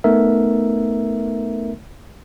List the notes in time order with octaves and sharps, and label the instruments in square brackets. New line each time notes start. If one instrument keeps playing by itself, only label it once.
[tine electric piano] A3 B3 D#4 A#4 E5